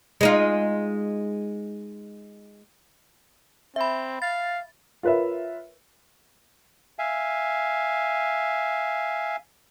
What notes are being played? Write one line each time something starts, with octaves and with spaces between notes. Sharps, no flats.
G#3 D#4 F4
C4 E5 B5
F5 A6
F4 A#4 B4 C#5 E5
E5 F5 G#5